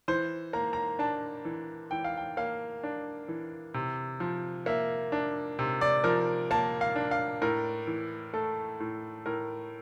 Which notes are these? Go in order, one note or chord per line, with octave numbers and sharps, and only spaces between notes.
E3 C5
A#3 A#5
A#5
D4 A5
E3
E3 G5
F5
G5
A#3 F5
D4
E3
C3
F3
A#3 E5
D4
C3
D5
F3 A#4
A#3 A5
F5
D4
F5
A2 A#4
E3
A3 A4
A2
A2 A#4